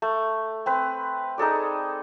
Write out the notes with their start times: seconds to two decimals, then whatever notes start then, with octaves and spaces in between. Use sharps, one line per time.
0.02 A3
0.66 C4 B4
1.38 D#4 G#4 A4 D5